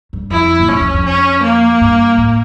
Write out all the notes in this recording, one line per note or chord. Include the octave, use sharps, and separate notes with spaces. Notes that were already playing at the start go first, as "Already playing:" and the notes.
G2
F2 E4
A2
G2 C#4
F2
F2
C#4
A#3
G2
A2